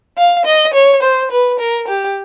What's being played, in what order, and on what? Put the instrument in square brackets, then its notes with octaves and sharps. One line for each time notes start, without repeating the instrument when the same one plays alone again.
[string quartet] F5
D#5
C#5
C5
B4
A#4
G4